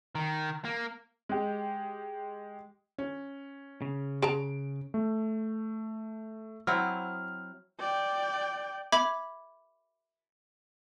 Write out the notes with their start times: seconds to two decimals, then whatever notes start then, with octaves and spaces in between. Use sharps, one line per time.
0.15 D#3
0.65 A#3
1.29 G#3 G4
2.98 C#4
3.82 C#3
4.22 G#4 A5 A#5 D7
4.94 A3
6.67 F#3 C4 E4 F6
7.79 D5 G5
8.92 E5 B5 D6 G#6